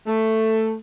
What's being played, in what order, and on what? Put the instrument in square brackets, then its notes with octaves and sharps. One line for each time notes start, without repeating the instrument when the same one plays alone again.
[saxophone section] A3